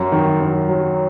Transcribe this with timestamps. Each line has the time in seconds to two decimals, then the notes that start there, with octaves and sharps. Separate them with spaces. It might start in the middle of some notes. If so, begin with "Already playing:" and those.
Already playing: F#2
0.12 D#3
0.41 F#2
0.69 F#3